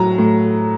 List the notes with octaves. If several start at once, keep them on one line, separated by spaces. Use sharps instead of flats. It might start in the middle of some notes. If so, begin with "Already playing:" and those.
Already playing: A2 F#3 A#5
A2